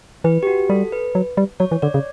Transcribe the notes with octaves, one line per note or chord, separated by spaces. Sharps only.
E3 B4
G4
F#4
G3 A4
B4
F#3
G3
F#3 C#5
E3 C#5
D3 D5
C#3